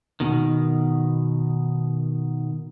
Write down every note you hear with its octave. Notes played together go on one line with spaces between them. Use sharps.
B2 D#3